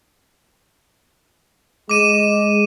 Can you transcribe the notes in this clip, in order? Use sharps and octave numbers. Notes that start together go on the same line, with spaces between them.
G#3 D6 D#7 E7